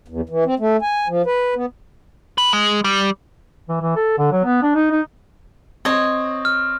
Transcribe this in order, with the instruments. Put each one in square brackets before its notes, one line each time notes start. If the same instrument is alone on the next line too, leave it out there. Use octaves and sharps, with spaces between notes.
[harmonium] E2
E3
C4
A3
G#5
F3
B4
B3
[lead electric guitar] B4
G#3
G3
[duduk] E3
E3
A4
D3
F#3
B3
D4
D#4
D#4
[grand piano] C4 [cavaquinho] C#5 D#5
[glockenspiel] F6